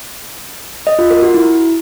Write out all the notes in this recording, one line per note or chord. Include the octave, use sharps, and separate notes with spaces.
D#5
F4
A#4
F#4
E4